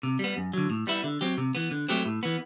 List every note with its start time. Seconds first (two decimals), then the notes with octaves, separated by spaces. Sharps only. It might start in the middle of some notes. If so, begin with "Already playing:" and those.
0.03 C3
0.19 G3 B3
0.37 F#2
0.53 D3 F#3
0.70 A2
0.87 G3 B3 E4
1.04 D3
1.21 F#3 C4 G4
1.38 C3
1.55 E3 B3
1.71 D3
1.89 F#3 A3 C4 G4
2.05 A2
2.23 E3 B3